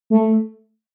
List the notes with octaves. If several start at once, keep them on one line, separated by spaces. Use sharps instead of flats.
A3